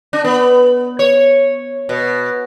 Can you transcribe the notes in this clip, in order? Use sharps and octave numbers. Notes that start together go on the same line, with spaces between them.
D4
B3
C#5
B2